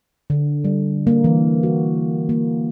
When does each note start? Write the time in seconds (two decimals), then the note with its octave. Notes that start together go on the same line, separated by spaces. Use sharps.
0.30 D3
0.64 G3
1.07 A#3
1.24 E3
1.63 F#4
2.29 A#3